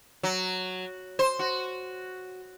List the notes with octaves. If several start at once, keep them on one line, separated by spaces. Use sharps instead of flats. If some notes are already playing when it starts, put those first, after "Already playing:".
F#3
C5
F#4